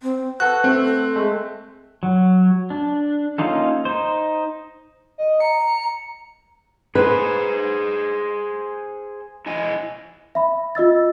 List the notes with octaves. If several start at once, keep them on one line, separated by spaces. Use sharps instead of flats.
C4
F#4 A4 B4 F#6
A3 C4
A4
G#3 A3
F#3
D4
A#3 C#4 D#4 F4 A4
D#4 C5
D#5
A#5 C#7
G#4 B4 C5
E4 D#5 G#5
E5 B5
F4 D#5 E6 A6